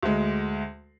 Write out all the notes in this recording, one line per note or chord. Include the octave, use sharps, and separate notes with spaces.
D2 G#3